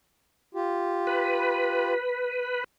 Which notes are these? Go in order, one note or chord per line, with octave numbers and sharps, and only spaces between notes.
F4 G4
B4